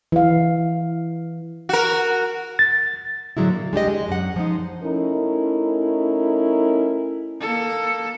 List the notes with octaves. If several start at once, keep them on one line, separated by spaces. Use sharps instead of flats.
E3 F5
F#4 A#4
A6
A2 D3 F#3 G#3 E4
A#3
G#3 D4 G4 D#5
G#3
F#2 F#5
F3 G#3 D#4
A3 C#4 D#4 E4 A#4
A#3 A4